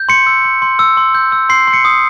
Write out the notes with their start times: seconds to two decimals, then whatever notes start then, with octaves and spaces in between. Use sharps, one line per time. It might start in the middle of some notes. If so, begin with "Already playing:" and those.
Already playing: G6
0.09 C6 C#7
0.27 E6
0.45 C6
0.62 C6
0.79 E6
0.97 C6
1.15 G6
1.32 E6
1.49 C6 C7
1.67 C6
1.73 C#7
1.85 D#6